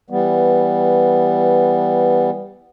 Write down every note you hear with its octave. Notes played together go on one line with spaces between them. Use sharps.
E3 G3 B3